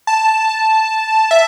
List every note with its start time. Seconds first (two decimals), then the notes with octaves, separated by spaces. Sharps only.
0.07 A5
1.31 E5